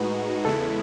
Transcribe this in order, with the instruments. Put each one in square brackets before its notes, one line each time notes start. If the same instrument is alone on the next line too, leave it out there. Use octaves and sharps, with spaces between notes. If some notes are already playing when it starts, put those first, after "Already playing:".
Already playing: [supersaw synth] A2 G#3 D#4 F#4 [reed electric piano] B4
[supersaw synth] E2 C#3 G#3 B3 E4 [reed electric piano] A4